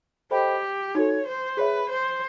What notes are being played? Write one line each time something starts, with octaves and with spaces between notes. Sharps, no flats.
G4 A4 C5 D#5 G5 B5
D#4 F#4 A4 C#5
C5
G#4 B4 C#5 E5
C5